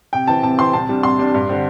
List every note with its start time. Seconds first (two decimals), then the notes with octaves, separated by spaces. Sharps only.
0.13 C3 G5
0.28 E3 C4 A5
0.43 C3 A5
0.59 E3 C4 C6
0.73 C2 A5
0.89 C3 G3 D4
1.03 C2 C6
1.19 C3 G3 D4
1.34 G2
1.49 D3 C4